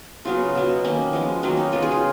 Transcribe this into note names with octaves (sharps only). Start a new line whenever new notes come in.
C#3 F#3 B3 F4
B2 F#3 B3
D#3 A#3 C#4
F3 G#3 B3
D#3 F#3 A#3 C#4
D#4
C#3 G#3 B3 F4
G#4
F4